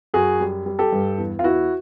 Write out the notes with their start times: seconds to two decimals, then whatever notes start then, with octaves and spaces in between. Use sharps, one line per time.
0.14 F#2 F#4 G#4
0.40 G3
0.66 G3
0.79 G4 A4
0.92 G2
1.18 E2
1.39 F4
1.43 E2 E4 F#4